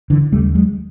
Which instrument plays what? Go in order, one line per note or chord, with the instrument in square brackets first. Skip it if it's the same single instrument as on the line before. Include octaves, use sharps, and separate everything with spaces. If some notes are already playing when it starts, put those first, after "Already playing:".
[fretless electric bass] D3 E3
D#2 C#3 G3 A3
F#3 G#3